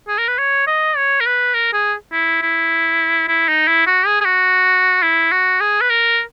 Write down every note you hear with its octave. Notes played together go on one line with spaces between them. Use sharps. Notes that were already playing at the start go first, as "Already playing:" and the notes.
G#4
A#4
B4
C#5
D#5
C#5
A#4
B4
A#4
G#4
E4
E4
E4
D#4
E4
F#4
G#4
G#4
F#4
E4
F#4
G#4
B4
A#4